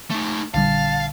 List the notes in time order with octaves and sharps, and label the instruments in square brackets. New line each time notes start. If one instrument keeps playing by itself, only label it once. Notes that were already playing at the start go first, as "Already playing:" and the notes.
[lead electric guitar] A3 D#4
[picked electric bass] A#1 D3 G3 [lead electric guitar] F5 [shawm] A5